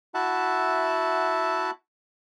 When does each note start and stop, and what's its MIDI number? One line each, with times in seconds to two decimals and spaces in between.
0.14 1.71 64
0.14 1.71 66
0.14 1.71 76
0.14 1.71 78
0.14 1.71 81